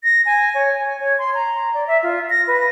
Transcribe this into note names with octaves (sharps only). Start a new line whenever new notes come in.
A#6
G#5
C#5
G#5
C#5
C6
A#5
D5
E5
F4
A#6
B4